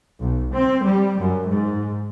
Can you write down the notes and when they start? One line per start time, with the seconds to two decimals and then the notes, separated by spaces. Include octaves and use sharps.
0.19 B1
0.54 C4
0.84 G3
1.20 F#2
1.49 G#2